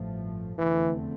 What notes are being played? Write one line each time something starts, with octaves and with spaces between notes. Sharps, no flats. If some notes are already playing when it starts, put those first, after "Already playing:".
Already playing: A1 G2 F3 A3
F1 E2 D3 E3 A3 C4